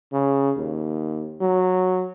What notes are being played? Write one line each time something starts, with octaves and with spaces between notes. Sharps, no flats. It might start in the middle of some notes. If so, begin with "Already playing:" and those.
C#3
D#2
F#3